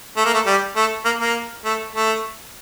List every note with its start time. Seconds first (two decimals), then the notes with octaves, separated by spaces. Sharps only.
0.17 A3
0.25 A#3
0.34 A3
0.46 G3
0.76 A3
1.05 A#3
1.21 A#3
1.65 A3
1.94 A3